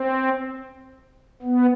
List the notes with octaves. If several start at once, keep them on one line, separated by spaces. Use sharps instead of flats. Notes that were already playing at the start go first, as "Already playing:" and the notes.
Already playing: C4
B3